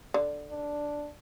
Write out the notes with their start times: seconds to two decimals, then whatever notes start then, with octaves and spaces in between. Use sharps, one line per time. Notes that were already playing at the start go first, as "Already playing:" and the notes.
0.14 D3
0.50 D4